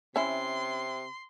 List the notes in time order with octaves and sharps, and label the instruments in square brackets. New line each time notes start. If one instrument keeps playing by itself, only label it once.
[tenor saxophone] C3 [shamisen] C#4 E4 [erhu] C6